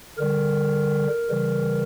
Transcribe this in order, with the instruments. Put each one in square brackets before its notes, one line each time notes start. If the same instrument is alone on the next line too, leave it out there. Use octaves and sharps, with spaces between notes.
[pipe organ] D3 G3 A#4
C#3 E3 G3